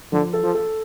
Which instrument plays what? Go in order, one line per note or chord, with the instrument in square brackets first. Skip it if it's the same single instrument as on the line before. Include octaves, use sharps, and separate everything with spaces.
[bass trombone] D3 [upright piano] F3
[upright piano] A4
[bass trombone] F3
[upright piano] A4